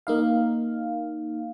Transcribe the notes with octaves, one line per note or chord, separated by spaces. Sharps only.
A#3 D#4 F5